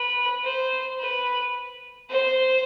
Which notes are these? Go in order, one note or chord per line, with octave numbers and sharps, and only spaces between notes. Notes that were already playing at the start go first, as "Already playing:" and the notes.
Already playing: B4
C5
B4
C5